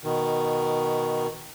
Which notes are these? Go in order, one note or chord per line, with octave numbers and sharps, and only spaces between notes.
B2 D#3